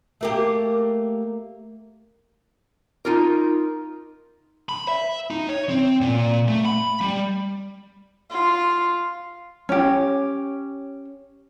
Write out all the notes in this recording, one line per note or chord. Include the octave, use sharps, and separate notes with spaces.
A3 A#3 G4
D#4 F4 A#4
B5
E5
D#4
C#5
C4
A#2
A3
B5
G3
F4
C#4 G4